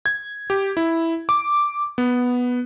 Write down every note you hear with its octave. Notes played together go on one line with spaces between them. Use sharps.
G#6
G4
E4
D6
B3